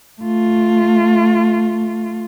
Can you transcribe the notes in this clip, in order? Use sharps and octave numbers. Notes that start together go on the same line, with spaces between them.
A3 F4